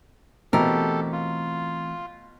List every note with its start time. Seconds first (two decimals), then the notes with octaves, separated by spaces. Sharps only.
0.53 B2 E3 A3 C4 G4 A4 A#4
1.12 F4